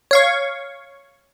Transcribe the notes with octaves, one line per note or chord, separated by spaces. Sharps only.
C#5 F5 C#6